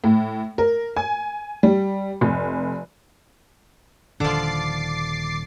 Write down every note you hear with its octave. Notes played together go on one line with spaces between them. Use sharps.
A2
A#4
G#5
G3
F1
D#1 D3 D#3 F3 D4 D6 A6 C7